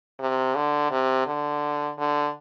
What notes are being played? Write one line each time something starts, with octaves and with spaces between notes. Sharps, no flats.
C3
D3
C3
D3
D3